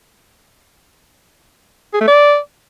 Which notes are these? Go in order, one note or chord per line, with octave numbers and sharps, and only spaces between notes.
G#4
A3
D5